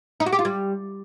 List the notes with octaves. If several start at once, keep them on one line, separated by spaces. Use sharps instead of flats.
D#4
F#4
G4
F4
G3